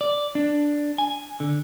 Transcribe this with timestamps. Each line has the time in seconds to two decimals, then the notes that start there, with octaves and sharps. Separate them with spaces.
0.01 D5
0.35 D4
0.98 G#5
1.40 D3